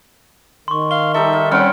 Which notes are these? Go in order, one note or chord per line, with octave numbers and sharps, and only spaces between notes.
D#3 C6 C#6
F5 G7
G3 D#4 A4 E5
F5
G3 C4 C#4 F#5 F6 D7